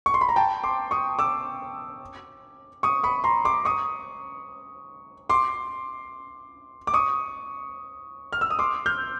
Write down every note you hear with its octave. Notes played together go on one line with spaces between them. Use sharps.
C#6
C6
B5
A#5
G5 A5
C6 D6
C#6 D#6
D6 E6
C#6 D#6
B5 C#6
A#5 C6
C6 D6
C#6 D#6
C6 D6
D6
C#6 D#6
F6
E6
D#6
C6 D6
F6 G6